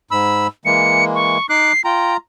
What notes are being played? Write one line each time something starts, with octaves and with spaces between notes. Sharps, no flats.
G#2 B5 E6
E3 G#3 A#3 C#7
C#6
D#4 D6 F#6 C7
F4 G5 A#5